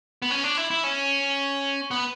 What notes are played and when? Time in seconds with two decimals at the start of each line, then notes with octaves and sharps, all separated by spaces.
0.22 B3
0.31 C#4
0.44 D4
0.57 E4
0.71 E4
0.84 C#4
1.91 B3